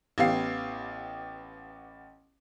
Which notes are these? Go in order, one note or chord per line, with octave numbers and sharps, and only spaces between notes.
A1 B3 G4 F5 C7